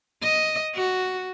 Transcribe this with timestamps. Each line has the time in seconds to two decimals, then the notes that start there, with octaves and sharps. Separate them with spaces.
0.22 D#5
0.75 F#4